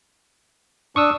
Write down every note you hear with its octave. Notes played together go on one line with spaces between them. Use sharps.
D4 C#6 D#6 E6